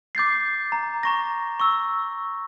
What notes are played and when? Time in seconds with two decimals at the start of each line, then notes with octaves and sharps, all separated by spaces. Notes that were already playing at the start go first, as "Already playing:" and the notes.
0.15 D6 G6 A6 C7
0.72 A#5
1.03 A#5 C#6 A#6
1.60 C#6 E6